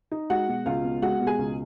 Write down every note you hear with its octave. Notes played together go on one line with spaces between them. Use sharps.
D#4
G#3 F#4 F#5
B2
C#2 F4 F5
B3
G#3 F#4 F#5
B2
G#4 G#5
C#2